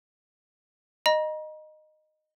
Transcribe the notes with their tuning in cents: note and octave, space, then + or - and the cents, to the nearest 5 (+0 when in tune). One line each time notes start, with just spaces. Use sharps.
D#5 -15 A#5 +40